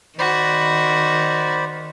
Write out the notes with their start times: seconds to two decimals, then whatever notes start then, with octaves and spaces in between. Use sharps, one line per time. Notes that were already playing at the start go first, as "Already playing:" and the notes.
0.19 D#3 F#4 C5 D5 B5